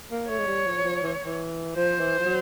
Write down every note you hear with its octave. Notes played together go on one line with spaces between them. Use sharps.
A#3
A3 C#5
G#3
G3
F3
F3
E3
E3
F3 C5
E3
F3
F#3